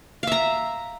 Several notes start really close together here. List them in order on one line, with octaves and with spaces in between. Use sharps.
F5 E5 A#5